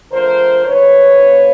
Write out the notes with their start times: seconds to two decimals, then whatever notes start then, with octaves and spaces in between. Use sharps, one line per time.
0.11 D3 F3 A3 A#4 C5
0.65 G#2 D#3 G3 B4 C#5
1.18 C#3 F#3 A#3